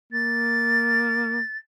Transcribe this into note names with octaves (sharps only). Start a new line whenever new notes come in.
A#3 A6